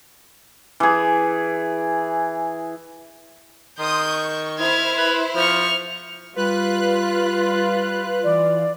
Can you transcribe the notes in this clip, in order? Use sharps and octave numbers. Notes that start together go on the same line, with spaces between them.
E3 G#4
D#3 C6 D#6 G6
C#6
E4 C5 F6 G#6
B4
F3 C#6 F6
G3 F4 B4 F#6
E3 D5